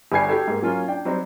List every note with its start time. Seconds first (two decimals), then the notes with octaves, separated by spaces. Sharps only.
0.12 G1 G3 G#5 G#6 C7
0.29 F#4 G4 A4
0.48 G#2 A#3
0.62 F#3 A#3 C#4 F4
0.88 D4 G5
1.05 F#3 G3 C4 D#4